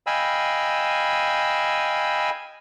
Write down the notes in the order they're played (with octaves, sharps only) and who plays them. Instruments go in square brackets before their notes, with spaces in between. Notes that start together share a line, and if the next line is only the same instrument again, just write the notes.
[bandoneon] D#5 F5 G5 G#5 B5 E6